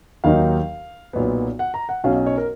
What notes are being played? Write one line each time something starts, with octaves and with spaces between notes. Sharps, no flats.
D#2 D#3 F#3 A#3 D#4 F5
B1 A#2 F#3 B3
F#5
A#5
F#5
B1 B2 F#3 C#4 F5
D#5
C#5
A#4